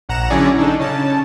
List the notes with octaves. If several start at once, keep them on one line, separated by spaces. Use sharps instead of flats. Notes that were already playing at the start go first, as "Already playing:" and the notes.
A#1 F#5 A#5 E7
D3 F#3 C#4 E4 G#4 D5
D4 D#4 A4
C#3 A5